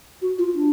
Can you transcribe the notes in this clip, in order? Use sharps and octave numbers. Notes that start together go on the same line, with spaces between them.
F#4
F4
D4